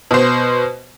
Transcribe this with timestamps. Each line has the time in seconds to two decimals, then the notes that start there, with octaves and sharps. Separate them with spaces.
0.11 B2 C5